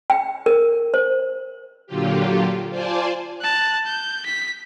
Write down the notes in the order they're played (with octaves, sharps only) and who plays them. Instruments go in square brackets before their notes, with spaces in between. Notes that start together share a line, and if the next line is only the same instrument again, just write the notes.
[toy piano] G5
A#4
C5
[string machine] A#2 D3 F#3 F4 G4
F4 C5 D5 G#5 A5
[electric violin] A5 F#6
G6
B6